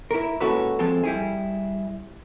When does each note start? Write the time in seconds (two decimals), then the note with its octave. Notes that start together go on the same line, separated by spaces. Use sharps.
0.11 E4 A#4
0.41 A#2 G#3 C#4 F#4 A4 B4
0.79 F3 G#3 C4 A4
1.04 G3 E4 G#4